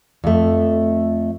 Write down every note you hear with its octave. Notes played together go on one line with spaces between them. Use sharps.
F2 A3